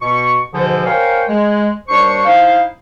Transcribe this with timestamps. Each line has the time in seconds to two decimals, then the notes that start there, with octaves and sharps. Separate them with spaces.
0.02 B2 C#6
0.54 G#2 B2 D3 E3 F3
0.86 A#4 C5 C#5 F5 G5 G#5
1.29 G#3
1.89 D#2 G3 D4 C5 C#6
2.25 D#4 E4 C5 F5